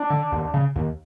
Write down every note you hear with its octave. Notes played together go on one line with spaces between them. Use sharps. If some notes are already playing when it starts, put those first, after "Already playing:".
Already playing: D4
D3
D#2
C#3
D#2